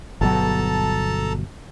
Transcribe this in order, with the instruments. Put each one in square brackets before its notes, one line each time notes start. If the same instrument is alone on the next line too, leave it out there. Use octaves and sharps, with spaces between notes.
[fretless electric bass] G1 B2 F#3 [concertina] A4 A5 A#5